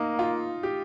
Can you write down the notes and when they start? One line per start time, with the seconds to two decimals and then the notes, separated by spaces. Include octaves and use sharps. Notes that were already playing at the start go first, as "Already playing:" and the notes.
Already playing: A#3 D#4
0.19 F4
0.63 G4